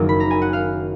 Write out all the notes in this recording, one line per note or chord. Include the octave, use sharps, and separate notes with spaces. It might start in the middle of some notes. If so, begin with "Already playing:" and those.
Already playing: F#1 F#2 D#3 F#3
B5
A#5
G#5
F#5
F5